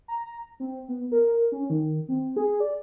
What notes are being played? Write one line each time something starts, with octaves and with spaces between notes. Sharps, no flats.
A#5
C4
B3
A#4
C#4
D#3
C4
G#4
D5